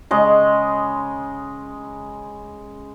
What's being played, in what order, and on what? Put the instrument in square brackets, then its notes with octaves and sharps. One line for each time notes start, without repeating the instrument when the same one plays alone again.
[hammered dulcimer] C#3 G#3 D#5